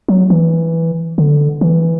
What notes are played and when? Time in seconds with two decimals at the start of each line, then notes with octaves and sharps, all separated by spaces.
0.08 F#3
0.30 E3
1.18 D3
1.61 E3